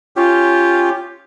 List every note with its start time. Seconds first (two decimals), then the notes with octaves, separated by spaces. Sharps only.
0.16 C#4 F4 G4